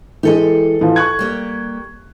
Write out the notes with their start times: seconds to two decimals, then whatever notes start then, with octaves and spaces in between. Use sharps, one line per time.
0.23 E3 G#3 G4 A4 D#5
0.81 E3 F3
0.96 C#6 F#6 G#6
1.19 G3 A#3 G4